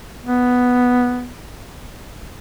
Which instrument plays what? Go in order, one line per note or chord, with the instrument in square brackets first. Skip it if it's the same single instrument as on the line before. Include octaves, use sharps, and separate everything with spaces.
[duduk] B3